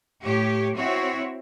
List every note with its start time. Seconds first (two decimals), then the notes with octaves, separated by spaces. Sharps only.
0.23 A2 G4 C#5
0.76 C4 E4 F#4 C#5